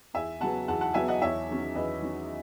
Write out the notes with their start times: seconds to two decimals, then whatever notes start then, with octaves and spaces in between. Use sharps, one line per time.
0.14 E2 E5 G#5
0.40 C#3 F#3 B3 F#5 A5
0.68 E2 F#5 A5
0.81 F#5 A5
0.94 C#3 F#3 B3 E5 G#5
1.08 D#5 F#5
1.21 E2 C#5 E5
1.49 D#3 F#3 C#4
1.75 E2 B4 D#5
2.02 D#3 F#3 C#4